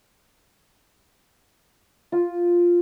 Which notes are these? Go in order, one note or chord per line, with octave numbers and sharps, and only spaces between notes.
F4